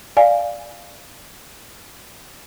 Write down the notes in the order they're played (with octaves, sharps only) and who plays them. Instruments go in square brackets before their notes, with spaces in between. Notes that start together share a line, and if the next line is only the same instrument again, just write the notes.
[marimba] D5 F5 G#5